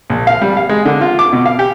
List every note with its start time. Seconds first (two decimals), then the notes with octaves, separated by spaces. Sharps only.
0.10 A#1
0.27 F5
0.42 G3
0.57 F5
0.69 G#3
0.85 D3
1.01 F4
1.19 D6
1.33 B2
1.46 F5
1.59 G4